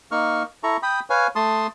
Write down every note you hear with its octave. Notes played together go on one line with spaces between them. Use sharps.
A#3 D#4 C#6 F6
E4 A4 A#5 C#6
G5 B5 D#6
B4 C#5 F5 G#5
A3 A5 C6 D#6